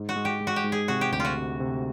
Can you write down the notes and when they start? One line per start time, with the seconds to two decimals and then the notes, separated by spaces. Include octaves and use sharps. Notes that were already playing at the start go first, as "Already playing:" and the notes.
Already playing: G#2
0.09 F#4
0.16 G#3
0.25 G4
0.41 G#3
0.47 F#4
0.56 G4
0.64 G#2
0.72 G#4
0.88 C3 F#4
1.01 G4
1.12 D2 G4
1.20 F4 F#4
1.36 C3
1.60 C3